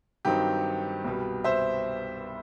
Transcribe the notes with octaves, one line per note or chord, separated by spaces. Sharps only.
G2 D#3 F#3 C4 D#4 G4
C2 B2 G3
C5 E5